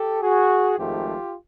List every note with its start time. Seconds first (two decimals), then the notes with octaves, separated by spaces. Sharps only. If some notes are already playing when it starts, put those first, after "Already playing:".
Already playing: G4 A4
0.22 F#4 G#4
0.76 G#1 G#2 F3 A3 F4 G4